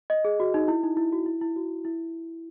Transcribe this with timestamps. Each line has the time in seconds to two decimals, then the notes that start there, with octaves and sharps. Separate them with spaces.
0.10 D#5
0.25 G#4
0.40 F#4
0.54 D#4
0.68 E4
0.83 D#4
0.97 E4
1.12 F#4
1.26 E4
1.41 E4
1.56 F#4
1.85 E4